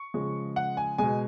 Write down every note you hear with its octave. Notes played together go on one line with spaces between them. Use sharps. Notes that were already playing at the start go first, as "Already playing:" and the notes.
Already playing: C#6
C#3 F3 G#3
F#5
G#5
B2 G#3 G#5